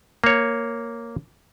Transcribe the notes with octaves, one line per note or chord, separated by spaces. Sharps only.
A#3 C#5